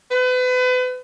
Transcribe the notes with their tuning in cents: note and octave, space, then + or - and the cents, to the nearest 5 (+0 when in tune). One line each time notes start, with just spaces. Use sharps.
B4 +35